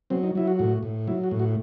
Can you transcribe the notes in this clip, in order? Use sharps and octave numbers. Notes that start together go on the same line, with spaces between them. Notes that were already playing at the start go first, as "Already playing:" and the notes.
F#3 C4
D#4
F#3 E4
F#4
A2 F#4
A2
F#3 E4
F#4
A2
F#4